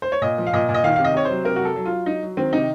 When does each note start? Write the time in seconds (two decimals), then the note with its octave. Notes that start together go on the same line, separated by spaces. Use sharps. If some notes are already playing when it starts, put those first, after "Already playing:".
0.02 C5
0.12 C#5
0.22 A#2 D#5
0.38 F3
0.47 F5
0.53 A#2 D#5
0.69 A#2
0.74 D#5
0.84 D#3 F5
0.96 C3 F5
1.04 D#5
1.14 C3 C#5
1.25 F#3 C5
1.45 C3 A#4
1.56 F#3 F#4
1.65 A4
1.76 F#3
1.85 F4
1.91 F#3
2.06 F#3 D#4
2.22 F#3
2.37 D#3 C4
2.52 C3 D#4